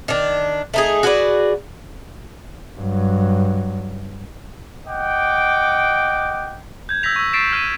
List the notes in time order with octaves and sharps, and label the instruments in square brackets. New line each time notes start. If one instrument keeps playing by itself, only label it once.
[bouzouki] D#3 D4
A3 D#4 G#4
F#4 G#4 B4 D5
[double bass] G2 F#3
[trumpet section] D#5 F#5 G5 D6
[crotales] G6 G#6
E6 G6 G#6 A#6 B6 F7
C#6 E6
C#6 A6 B6 C7 D7 E7
F6 G6 D#7